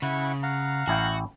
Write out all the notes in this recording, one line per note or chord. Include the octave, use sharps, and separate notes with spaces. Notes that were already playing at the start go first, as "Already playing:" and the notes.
C#3 E4 F#5 C#6
F5 F#5 A#5
A1 E4 F#4 G5